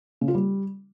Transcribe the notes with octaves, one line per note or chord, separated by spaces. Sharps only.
C#3
F4
G3